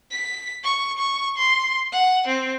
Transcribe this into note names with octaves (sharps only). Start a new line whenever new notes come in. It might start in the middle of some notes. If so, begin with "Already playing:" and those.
B6
C#6
C#6
C6
F#5
C4